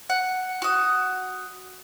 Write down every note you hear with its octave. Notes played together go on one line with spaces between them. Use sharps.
F#5
F#4 D#6